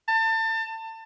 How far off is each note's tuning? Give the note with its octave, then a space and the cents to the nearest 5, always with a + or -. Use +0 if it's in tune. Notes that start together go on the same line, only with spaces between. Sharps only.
A5 +30